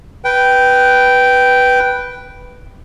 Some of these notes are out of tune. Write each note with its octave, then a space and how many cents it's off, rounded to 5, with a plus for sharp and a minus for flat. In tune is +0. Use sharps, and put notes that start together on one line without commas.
B4 +0 G5 -10